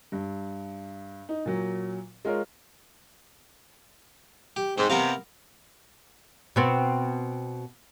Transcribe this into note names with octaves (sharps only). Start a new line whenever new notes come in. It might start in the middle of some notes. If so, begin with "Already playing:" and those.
G2
D#4
A#2 F#3
G#3 F4 A#4 C#5
G4
G#2 C4
C3 B3 A#4 F5
B2 B3 C4